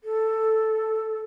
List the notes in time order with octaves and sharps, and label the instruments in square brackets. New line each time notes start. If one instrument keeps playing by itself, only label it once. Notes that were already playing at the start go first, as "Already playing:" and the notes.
[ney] A4